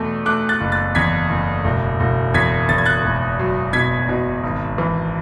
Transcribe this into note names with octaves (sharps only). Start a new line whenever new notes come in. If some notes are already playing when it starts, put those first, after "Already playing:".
Already playing: E2 B2 A3 D6
A3 D6 F#6
F#6 A6
F#1
F#6 A6
E2 G#6 B6
F#1
E1
E1
E2 G#6 B6
E2 A6
G#6
F#6 A6
E1
F#3
B2 G#6 B6
B2
G#1
E3